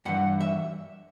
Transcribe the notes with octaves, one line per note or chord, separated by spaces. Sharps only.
G2 E3 F#5
E5